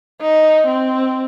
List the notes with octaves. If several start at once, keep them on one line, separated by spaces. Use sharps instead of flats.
D#4
C4